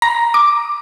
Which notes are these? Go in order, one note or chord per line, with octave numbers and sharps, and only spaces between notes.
A#5
D6